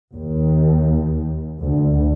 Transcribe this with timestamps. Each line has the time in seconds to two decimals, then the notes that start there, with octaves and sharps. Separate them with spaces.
0.14 D#2
1.60 D2